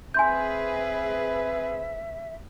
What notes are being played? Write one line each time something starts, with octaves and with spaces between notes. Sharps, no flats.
C4 G#4 B4 E5 G#5 C6 G6